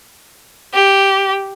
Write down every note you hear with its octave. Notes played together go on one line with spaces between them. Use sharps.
G4